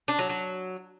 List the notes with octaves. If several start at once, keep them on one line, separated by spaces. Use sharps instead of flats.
D4
F#3
F#3